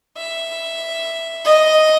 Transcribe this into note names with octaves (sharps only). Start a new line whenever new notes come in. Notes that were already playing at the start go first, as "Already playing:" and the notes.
E5
D#5